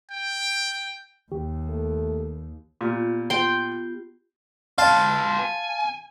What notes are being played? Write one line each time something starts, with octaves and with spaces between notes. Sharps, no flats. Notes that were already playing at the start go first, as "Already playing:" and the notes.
G5
D#2 D#3 G4
A3
A#2 B3 F4 G4
G5 C6
F4 B4 F5 A5
G#5